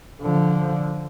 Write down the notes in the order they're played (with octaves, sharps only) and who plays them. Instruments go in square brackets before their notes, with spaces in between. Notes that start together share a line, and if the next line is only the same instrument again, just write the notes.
[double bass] D3 F3